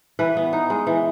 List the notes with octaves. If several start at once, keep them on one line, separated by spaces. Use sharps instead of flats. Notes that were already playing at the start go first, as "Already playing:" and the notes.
E3 B4
B3
D#4
G#3
E3